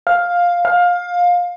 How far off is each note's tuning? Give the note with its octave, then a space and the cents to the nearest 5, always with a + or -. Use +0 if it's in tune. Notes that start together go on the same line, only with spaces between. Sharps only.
F5 +10
F5 +20